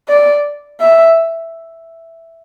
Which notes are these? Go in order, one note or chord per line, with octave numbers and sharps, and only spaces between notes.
D5
E5